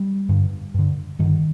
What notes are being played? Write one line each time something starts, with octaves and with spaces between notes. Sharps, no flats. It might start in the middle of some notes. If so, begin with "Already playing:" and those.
Already playing: G3
G2 D3
G2 D3
G2 D3 D#3